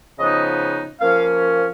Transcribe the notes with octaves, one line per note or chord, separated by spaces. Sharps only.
C#3 F3 B3 D#4 D#5
F3 A#3 C#4 F5